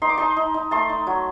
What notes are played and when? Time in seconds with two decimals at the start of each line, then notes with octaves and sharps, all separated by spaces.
0.02 D#4 C6
0.09 D6
0.18 D#4 A5 C6
0.36 D#4
0.54 D#4
0.71 A3 A5 C6
0.90 D#4
1.07 F#3